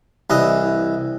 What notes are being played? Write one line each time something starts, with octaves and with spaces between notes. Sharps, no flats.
C2 E3 D#5